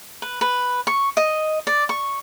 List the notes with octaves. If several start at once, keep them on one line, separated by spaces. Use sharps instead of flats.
B4
B4
C#6
D#5
D5
C#6